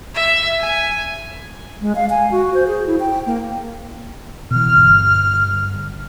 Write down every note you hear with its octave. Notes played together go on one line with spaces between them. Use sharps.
E5
G#5
G#3
F5
G#5
F#4
C5
G#4
E4
G5
A#3
B2 E3 F6
G1